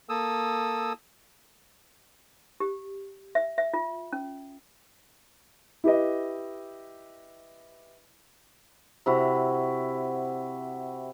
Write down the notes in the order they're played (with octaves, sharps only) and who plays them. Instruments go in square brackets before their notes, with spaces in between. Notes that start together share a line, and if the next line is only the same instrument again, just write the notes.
[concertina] A#3 A4 D#6 E6
[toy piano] G4
E5
E5
F4
C#4
[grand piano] E4 G4 B4 D#5
[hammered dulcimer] C3 E4 F#4